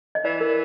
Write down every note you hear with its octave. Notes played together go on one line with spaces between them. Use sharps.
D#5
E3 D5
A#4